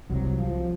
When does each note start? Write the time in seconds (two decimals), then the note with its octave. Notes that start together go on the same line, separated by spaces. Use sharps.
0.10 C2 C3 F#3
0.38 F3